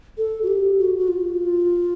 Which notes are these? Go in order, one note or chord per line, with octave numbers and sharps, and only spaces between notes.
A4
F#4
G4
F#4
F#4
F4